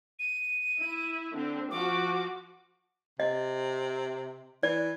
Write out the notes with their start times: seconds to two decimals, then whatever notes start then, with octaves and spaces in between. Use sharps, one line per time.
0.19 D#7
0.79 E4
1.32 D3 C4
1.71 F3 F#4 D6
3.20 C3 D#5
4.63 E3 D5